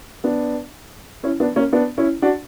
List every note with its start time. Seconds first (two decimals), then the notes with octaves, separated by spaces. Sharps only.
0.24 B3 D4
1.23 C#4 E4
1.40 B3 D4
1.56 A#3 C#4
1.73 B3 D4
1.98 C#4 E4
2.22 D4 F#4